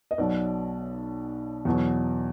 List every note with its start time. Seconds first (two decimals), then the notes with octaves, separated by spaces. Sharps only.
0.11 D#5
0.18 B1 B2 F#3 D5
1.65 E2 B2 F#3